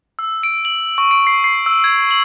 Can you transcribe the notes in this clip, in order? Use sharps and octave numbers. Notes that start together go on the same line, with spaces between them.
E6
D7
F#7
C#6
D7
C7
C7
E6
G#6
F#7